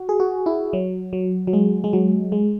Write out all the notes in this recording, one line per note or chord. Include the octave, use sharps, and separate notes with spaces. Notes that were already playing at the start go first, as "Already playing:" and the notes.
Already playing: F#4
G#4
F#4
E4
F#3
F#3
F#3
G#3
G#3
F#3
G#3